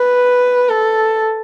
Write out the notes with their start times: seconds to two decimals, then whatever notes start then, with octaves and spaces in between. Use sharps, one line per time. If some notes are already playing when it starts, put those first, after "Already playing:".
Already playing: B4
0.70 A4